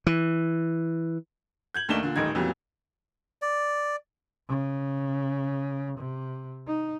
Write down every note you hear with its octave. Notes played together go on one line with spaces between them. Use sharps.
E3
G6 G#6 F#7
D#2 A3 D4 D#4 E7 G7
A#2 D3
D#1 A1 D#3 D#4 G#6
F2 A#2 E3 F#3 G3 B3
D5
C#3
C3
D#4